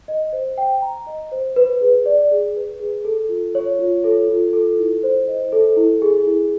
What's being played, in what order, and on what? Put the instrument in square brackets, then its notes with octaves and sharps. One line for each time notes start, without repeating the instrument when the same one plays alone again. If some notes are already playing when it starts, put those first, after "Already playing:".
[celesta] D#5
C5
G5
A#5
D#5
C5
B4
G#4
D5
G#4
B4
G#4
A4
F4
C#5
F4
A4
F4
A4
E4
C5
D#5
A4
E4
G#4
E4